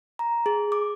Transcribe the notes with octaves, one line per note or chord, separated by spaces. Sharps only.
A#5
G#4
D6